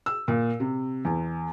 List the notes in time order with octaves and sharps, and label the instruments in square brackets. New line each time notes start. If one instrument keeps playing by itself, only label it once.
[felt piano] E6
A#2
C3
E2